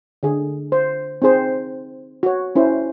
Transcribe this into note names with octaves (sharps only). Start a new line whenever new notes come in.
D3 G#4
C5
C4 D#4 G#4 C5
F#4 C#5
C#4 E4 C5